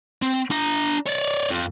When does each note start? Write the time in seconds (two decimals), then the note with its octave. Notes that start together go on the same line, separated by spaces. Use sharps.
0.22 C4
0.51 D4 A#5
1.07 C#5 D5
1.50 F2